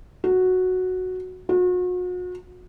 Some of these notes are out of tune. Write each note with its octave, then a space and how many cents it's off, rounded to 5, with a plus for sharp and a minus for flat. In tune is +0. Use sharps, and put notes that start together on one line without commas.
F#4 -5
F#4 -40